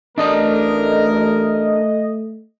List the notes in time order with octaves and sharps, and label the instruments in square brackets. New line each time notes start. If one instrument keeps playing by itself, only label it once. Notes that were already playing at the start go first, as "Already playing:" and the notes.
[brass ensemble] A1 A#4 [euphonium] A3 [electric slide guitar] D4 D5 A#5 [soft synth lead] D#5